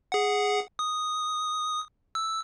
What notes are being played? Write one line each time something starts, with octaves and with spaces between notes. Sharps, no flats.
G#4 F#5
D#6
E6